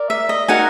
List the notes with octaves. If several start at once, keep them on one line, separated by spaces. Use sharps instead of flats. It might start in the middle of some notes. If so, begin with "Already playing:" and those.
Already playing: A#4 D5
E5
D#5
D#4 F#4 A#4 F#5 G#5